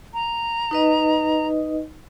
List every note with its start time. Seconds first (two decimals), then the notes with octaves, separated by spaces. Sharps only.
0.14 A#5
0.71 D#4 B4 D#5